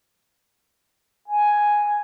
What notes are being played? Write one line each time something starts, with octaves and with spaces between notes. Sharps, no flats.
G#5